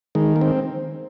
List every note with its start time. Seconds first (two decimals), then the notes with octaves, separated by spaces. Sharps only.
0.15 D#3 G#3
0.36 A#3
0.41 C4